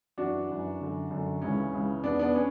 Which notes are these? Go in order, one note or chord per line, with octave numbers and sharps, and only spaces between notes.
F#2 E3 D4 F#4
F#2 E3
F#2 D3
F#2 D3
C#2 C#3 E3 C#4
C#2 C#3 E3
E2 B2 B3 D4
B3 D4
C#4